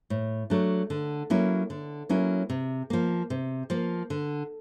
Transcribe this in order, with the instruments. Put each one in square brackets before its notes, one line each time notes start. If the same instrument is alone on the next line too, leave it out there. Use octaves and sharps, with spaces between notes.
[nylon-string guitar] A2
F#3 A3 D4
D3
F#3 A#3 C#4 E4
D3
F#3 A#3 C#4 E4
C3
F3 A#3
C3
F3 A#3
D3